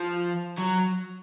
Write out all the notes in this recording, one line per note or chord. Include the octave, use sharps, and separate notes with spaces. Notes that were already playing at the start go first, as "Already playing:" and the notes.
Already playing: F3
F#3